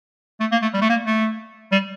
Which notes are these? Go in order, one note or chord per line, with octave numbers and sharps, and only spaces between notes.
A3
A#3
A3
G3
A3
A#3
A3
G3